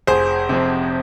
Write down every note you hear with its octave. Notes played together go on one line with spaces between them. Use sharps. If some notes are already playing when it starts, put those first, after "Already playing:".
F1 G#4 C5
F2 C3